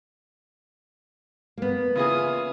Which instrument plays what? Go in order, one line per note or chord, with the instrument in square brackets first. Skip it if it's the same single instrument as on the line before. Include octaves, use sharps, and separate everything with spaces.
[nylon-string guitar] A#3 B3
[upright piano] C#3 E4 G#4 [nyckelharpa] F4 D#6